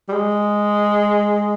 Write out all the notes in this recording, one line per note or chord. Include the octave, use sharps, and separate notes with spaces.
G3
G#3